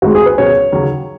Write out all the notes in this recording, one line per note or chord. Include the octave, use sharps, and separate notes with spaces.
G#1 G#2 G#3 F#4
G#4
B4
C#2 B2 F#3 C#4 C#5
D#2 C#3 F#3